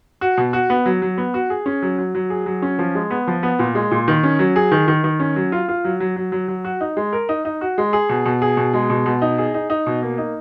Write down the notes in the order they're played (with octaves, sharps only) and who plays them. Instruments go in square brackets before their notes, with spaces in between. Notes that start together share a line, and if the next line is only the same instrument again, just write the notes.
[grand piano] F#4
B2
F#4
B3
F#3
F#3
B3
F#4
G#4
C#4
F#3
F#3
F#3
G#4
F#3
C#4
F3
G#3
B3
F3
B3
A#2
G#3
A#2
D#3
C#4
F#3
G#4
D#3
D#3
D#3
C#4
F#3
F4
F4
F#3
F#3
F#3
F#3
F#3
F#4
D#4
G#3
A#4
D#4
D#4
F#4
G#3
G#4
B2
B2
G#4
B2
G#3
B2
B2
D#4
G#4
D#4
D#4
B2
A#3
D#4